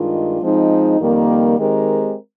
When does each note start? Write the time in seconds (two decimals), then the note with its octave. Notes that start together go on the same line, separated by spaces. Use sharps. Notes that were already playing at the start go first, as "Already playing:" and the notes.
Already playing: G2 D#3 G#3 D4 F4
0.42 F3 G#3 C4 D#4
1.00 F2 D#3 G3 A#3
1.57 D#3 G#3 C4 G4 A#4